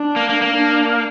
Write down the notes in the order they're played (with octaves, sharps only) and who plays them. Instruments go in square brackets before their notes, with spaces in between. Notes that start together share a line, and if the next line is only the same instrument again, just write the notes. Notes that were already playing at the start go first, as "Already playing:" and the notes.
Already playing: [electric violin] D4
[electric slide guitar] A#3
A#3
A#3
[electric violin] D4